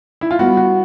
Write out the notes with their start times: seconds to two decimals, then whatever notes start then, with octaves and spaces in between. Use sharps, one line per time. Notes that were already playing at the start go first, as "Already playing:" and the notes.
0.21 E4
0.31 F4
0.39 G3 B3 E4 F#4
0.57 F#4